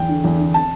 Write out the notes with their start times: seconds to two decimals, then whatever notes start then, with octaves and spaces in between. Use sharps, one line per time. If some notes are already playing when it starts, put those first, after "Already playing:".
Already playing: E2 G5
0.09 D3
0.24 E2
0.39 D3
0.54 A5